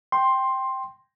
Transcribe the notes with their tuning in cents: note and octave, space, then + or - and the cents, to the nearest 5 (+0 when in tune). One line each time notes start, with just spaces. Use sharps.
G5 +0 C6 +10